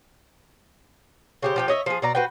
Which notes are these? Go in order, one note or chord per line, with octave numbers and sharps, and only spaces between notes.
C#3 G4 C5
F3 G4 G5
C#5 D#5 E5
F3 G#4
B2 D5 A#5
F#4 B4 C5 G5